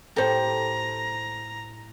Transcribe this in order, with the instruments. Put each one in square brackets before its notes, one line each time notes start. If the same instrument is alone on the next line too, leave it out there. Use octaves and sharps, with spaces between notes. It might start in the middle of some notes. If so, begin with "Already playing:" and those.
[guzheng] A2 G4 [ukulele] A4 C5 [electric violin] A#5